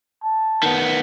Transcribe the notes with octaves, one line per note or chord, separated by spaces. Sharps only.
A5
D#3 B3